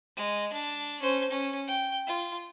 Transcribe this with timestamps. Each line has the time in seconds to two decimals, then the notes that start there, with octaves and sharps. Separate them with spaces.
0.16 G#3
0.52 D4
1.01 C#4 C5
1.30 C#4
1.67 G5
2.07 F4